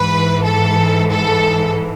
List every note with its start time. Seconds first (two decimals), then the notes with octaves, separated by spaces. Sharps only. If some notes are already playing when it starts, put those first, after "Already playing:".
Already playing: G#2 E3 B4
0.44 A4
1.11 A4